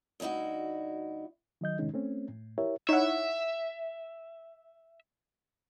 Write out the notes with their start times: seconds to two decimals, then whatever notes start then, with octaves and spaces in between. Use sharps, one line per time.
0.20 D2 G2 D#4 E4 F#4
1.61 D#3 F#3 D#5 G6
1.79 A2 C3 D#3 G#3 C#4 D#4
1.94 A3 C4 C#4
2.28 A2
2.58 E4 G4 A#4 C#5 E5
2.89 D#4 E4 C#5 E5 F#5